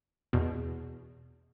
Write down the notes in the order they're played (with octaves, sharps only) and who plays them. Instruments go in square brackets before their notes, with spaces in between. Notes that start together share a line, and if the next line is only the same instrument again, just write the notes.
[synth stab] E2 B2